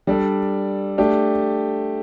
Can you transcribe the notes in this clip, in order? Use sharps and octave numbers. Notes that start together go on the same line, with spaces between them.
G3 D4 A4
A3 D4 G4